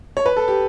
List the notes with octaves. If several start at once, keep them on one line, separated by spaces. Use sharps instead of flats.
C#5
B4
A4
G4